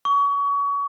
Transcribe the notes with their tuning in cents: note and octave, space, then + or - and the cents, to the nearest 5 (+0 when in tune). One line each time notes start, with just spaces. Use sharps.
C#6 +30